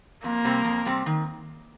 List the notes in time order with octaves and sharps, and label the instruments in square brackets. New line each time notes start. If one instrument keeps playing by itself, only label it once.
[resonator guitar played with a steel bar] F2 [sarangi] A#3
[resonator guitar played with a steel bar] C3 G3 C4
F2
C3 G3 C4
D#3